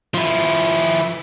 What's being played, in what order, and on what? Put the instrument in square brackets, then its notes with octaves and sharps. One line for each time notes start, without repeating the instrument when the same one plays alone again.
[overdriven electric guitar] F3 E4